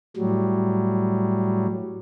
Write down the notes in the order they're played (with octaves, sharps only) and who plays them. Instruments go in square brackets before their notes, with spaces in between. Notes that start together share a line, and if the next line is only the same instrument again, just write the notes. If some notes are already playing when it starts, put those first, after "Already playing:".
[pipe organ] A2 F#3 G3